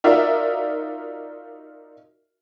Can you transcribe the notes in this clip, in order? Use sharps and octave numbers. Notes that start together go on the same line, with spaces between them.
D#4 F4 F#4 A#4 D5 E5